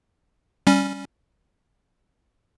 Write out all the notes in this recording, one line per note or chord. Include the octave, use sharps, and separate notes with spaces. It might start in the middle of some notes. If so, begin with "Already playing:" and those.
G3 C#4